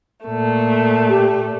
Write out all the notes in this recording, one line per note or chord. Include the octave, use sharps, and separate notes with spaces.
A#2 A3
G4